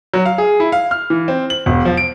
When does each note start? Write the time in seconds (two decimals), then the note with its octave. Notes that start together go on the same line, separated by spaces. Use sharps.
0.14 F#3
0.25 F5
0.38 G#4
0.60 E4
0.72 F5
0.91 F6
1.10 E3
1.28 C4
1.50 F#7
1.66 E1
1.85 F3
1.97 D7